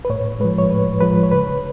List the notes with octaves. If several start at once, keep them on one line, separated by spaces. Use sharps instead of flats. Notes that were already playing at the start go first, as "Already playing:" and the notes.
B4
A2 C#5
F3 G#3 B4
C#5
A2 B4
F3 G#3 B4
C#5
C#3 B4